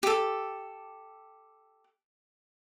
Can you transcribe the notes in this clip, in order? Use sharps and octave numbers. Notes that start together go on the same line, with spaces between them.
G4 A4